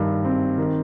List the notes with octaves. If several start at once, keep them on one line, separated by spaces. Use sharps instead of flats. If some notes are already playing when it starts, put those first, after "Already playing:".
Already playing: G2 D#3 G3
C4
D#3